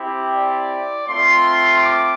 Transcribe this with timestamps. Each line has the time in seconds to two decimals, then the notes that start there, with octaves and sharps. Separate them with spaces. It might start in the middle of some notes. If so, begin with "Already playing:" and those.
Already playing: C4 E4 G4
0.34 D5
1.07 A3 C4 F4 C6
1.79 D6